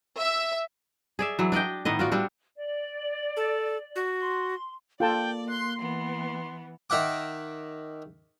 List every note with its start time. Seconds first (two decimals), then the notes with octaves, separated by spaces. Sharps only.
0.19 E5
1.19 G#4 D5 E5
1.39 E3 F#3
1.52 D4 D5 D#5 G5
1.85 A2 D#3 B3 D#5
1.99 F4 F#4 D5
2.12 G3 C4 D4 F#4
2.56 D5
3.37 A4
3.96 F#4
4.19 C6
5.00 A#3 F4 A4 D5 G5 A5
5.48 C6 F#6
5.78 E3 B3 C6
6.90 D#3 E5 F#5 D6